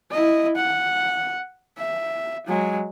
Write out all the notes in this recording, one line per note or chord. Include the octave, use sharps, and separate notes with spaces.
E4 D#5
F#5
E5
F#3 G#3